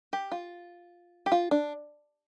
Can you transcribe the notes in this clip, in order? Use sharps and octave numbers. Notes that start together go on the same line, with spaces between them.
G4
F4
G4
F4
D4